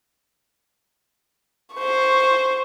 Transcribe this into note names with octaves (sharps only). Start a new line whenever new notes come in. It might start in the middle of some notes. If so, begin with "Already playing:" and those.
C5 C#6